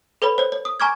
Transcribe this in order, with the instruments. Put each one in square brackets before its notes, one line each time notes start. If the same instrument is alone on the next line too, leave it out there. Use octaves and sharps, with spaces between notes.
[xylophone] A4 B4 C#5 B5
C5 C#5
C#5
D#6
G#5 A#5 C#6 D6 F6 G#6